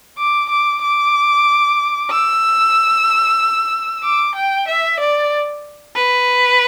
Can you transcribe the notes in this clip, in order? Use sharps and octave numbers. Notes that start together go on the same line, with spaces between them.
D6
D6
D6
E6
D6
G5
E5
D5
B4